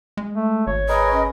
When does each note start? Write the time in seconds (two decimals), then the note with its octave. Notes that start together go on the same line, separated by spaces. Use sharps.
0.17 G#3
0.36 A3
0.67 G#1 C#5
0.89 G#4 A#4 B4 D#5
1.13 C#4